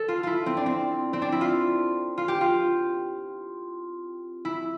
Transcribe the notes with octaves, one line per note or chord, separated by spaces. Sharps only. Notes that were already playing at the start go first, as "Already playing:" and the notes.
Already playing: A4
F4
E4 F4
C4
D4
C4
C4
D4
E4
F4
F4
G4
F4
E4